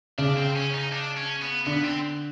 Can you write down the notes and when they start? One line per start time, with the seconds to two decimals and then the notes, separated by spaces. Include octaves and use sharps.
0.18 C#3 D4
0.37 C4
0.56 C#4
0.74 D#4
0.93 D4
1.17 C#4
1.42 B3
1.66 D3 B3
1.85 C4